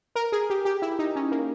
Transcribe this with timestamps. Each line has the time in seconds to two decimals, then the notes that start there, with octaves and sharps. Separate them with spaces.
0.15 A#4
0.32 G#4
0.50 G4
0.65 G4
0.82 E4
0.99 D#4
1.16 C#4
1.31 A#3